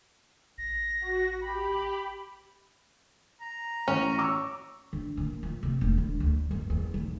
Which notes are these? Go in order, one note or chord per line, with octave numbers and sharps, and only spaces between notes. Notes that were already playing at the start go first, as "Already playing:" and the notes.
A1 A#6
F#4
G4 B5
A#5
A1 C#4
C#6 D6 E6
D3
A#2
F3
C3
E1
D3
D2
F#2
E2
B1